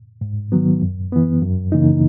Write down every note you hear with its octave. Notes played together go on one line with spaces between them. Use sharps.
G#2
D#3 F#3 B3
F#2
E3 B3
F#2
C#3 E3 A#3 D#4